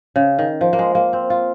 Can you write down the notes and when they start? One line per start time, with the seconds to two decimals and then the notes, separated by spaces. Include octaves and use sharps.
0.16 C#3
0.39 D#3
0.61 F3
0.73 A#3
0.79 G#3
0.95 A#3
1.13 C4
1.30 F4